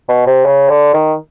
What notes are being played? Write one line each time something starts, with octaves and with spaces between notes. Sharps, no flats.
B2
C3
C#3
D3
D#3